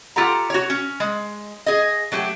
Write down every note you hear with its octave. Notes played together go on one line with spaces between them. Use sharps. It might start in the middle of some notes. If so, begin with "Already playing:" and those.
F4 G4 A4 F#5 A#5
F#4 C#5
C#4
G#3
G#4 D#5
F#3 A3 G4